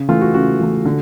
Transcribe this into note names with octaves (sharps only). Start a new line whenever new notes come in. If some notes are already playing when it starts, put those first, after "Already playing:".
Already playing: C#3
E3 A3 F4
F#4
C#3 F#4
E3 A3
D3